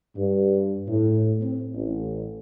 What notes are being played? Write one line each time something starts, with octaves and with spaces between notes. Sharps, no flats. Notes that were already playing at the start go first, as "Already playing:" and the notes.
G2
A2
C4
A1